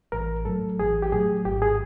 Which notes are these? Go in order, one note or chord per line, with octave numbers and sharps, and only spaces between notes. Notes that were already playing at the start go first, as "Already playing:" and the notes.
A1 A#4
A2 F#3 A4
A1 G#4
G4
A2 F#3 G#4
G#1 G4
G#4